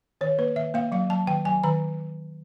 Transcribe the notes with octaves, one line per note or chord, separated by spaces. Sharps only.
D#3 C#5
A#3 B4
D#3 E5
A#3 F5
F#3 F5
F#3 A5
D#3 G5
F#3 G#5
D#3 A#5